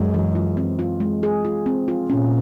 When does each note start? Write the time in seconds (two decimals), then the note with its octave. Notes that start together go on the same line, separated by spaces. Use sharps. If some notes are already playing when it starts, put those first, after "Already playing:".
Already playing: F#2 G#3
0.14 E3
0.35 F4
0.57 C4
0.79 F4
1.00 G#3
1.23 G#4
1.45 F4
1.66 C4
1.88 F4
2.09 A#2 C#4